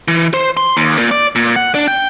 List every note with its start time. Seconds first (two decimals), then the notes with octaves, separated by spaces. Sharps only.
0.08 E3
0.34 C5
0.57 C6
0.77 D#2
0.98 A#2
1.11 D5
1.36 A#2
1.56 F#5
1.74 D4
1.88 G5